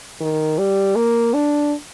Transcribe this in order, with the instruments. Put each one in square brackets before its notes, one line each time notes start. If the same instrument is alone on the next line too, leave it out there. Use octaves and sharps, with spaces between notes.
[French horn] D#3
G3
A#3
D4